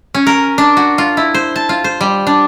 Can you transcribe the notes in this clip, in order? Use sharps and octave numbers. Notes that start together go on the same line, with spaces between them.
C#4
A#4
D4
F#4
F4
E4
C5
A5
F4
C5
G3
D4